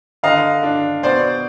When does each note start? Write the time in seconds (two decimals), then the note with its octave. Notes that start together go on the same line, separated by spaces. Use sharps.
0.23 D3 D#5 F5
0.63 D4
1.03 B2 C5 D5